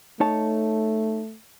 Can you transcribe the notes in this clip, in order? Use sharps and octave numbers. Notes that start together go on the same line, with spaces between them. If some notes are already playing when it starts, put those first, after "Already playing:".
A3 D#4 C#5 A5